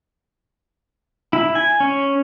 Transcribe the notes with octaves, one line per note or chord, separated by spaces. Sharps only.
E4
G#5
C#4